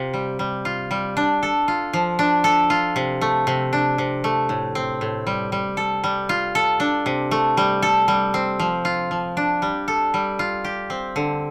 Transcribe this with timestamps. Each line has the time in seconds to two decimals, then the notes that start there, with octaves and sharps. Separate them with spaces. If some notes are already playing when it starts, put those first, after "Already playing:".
Already playing: C3 F4
0.14 G3
0.39 G3
0.65 F4
0.91 G3
1.17 D4
1.43 A4
1.68 F4
1.93 F3
2.19 D4
2.44 A4
2.70 F4
2.96 C3
3.21 A3
3.47 C3
3.73 D4
3.98 C3
4.24 A3
4.49 A2
4.75 C4
5.01 A2
5.27 G3
5.52 G3
5.77 A4
6.04 G3
6.29 F4
6.55 A4
6.80 D4
7.06 C3
7.31 A3
7.57 G3
7.83 A4
8.08 G3
8.34 C4
8.59 F3
8.85 F4
9.11 F3
9.37 D4
9.62 G3
9.88 A4
10.14 G3
10.39 F4
10.65 G4
10.90 C4
11.16 D3